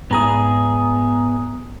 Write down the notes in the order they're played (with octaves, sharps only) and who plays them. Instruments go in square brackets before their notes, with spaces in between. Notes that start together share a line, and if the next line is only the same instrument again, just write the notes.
[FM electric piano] G#2 A#5 D#6 [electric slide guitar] B3 G#4